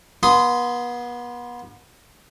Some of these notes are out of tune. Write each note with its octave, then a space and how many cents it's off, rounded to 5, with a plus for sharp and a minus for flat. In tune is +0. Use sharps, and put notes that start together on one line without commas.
B3 -35 C6 -15 D#6 +0